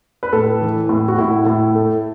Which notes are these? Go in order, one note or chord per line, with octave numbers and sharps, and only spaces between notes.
B4
A2 A4
E3
A2
F#4
A2 E4
A2
A3